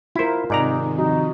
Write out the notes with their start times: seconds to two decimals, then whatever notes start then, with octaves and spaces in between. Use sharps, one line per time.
0.16 E4 F4 A#4 C5
0.50 G#2 C3 D#3 D#4 D5 A#5
0.99 F3 D#4 F#4